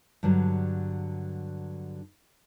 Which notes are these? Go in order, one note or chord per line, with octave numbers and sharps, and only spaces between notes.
G2 D3 F#3